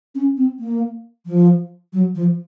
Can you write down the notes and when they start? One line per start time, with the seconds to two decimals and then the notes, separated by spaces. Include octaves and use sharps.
0.15 C#4
0.37 C4
0.59 A#3
1.26 F3
1.93 F#3
2.15 F3